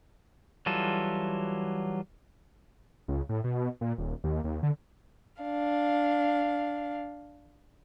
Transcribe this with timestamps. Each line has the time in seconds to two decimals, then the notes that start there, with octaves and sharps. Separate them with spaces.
0.66 E3 F#3 G3 F4 A4
3.08 C#2
3.29 A2
3.44 B2
3.81 A#2
3.98 D#1
4.24 D#2
4.44 D#2
4.63 D3
5.43 D4 F5